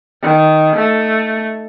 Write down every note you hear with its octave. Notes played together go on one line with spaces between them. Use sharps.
D#3
A3